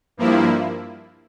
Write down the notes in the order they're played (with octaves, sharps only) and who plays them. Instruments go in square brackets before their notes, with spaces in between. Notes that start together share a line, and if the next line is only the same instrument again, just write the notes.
[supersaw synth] G2 F3 A#3 E4